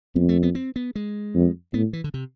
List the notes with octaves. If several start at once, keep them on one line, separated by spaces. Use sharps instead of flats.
F2 B3
A3
B3
C4
B3
G#3
F2
A2 B3
E3
D3
C3